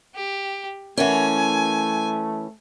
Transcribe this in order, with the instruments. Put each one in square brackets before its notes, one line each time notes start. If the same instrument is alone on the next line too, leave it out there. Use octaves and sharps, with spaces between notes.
[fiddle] G4
[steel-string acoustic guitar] E3 C#4 [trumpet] A3 [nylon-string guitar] A#4 E5 F#5 [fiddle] G#5